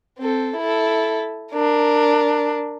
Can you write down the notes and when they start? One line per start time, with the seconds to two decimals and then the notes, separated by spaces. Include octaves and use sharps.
0.18 C4 A4
0.57 E4 A4
1.52 D4 A#4